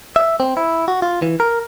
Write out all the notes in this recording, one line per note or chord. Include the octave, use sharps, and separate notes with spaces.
E5
C4
E4
F#4
F4
E3
A#4